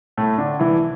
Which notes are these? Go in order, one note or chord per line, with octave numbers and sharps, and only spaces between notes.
A2 A3
D3 D4
E3 E4